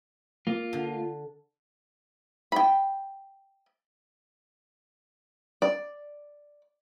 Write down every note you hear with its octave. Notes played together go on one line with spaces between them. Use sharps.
A#3 F4
D3
G5 B5
D5